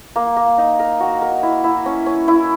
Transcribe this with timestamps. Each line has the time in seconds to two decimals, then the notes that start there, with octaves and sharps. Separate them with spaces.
0.16 A#3
0.36 A#3
0.58 D#4
0.79 A#4
1.00 F#4
1.22 A#4
1.43 E4
1.64 E4
1.86 C#4
2.06 C#4
2.28 E4